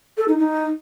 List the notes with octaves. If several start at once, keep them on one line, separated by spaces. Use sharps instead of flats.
A4
D#4
D#4